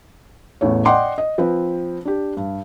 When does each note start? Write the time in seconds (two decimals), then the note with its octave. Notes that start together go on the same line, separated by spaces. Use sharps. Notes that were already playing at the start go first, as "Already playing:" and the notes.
0.61 A1 E2 A3 C#5
0.85 D5 D#5 F#5 G5 C6 D6
1.18 D#5
1.38 F3 C4 B4
2.05 D4 G4
2.37 G2